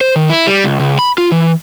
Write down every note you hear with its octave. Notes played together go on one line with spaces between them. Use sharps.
C5
D#3
E4
G3
C#2
C#2
B5
F4
E3